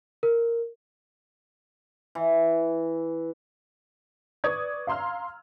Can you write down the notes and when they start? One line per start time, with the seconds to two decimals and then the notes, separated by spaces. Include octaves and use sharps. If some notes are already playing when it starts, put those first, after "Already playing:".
0.23 A#4
2.15 E3
4.44 B4 D5 C#6 D#6 G#6
4.87 F5 A#5 C6 E6 F6